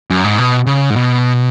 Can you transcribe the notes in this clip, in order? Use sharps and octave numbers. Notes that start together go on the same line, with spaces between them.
F#2
G#2
B2
C#3
G#2
B2